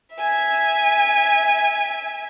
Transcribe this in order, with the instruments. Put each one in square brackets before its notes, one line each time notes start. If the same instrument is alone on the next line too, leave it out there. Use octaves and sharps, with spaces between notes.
[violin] E5 G#5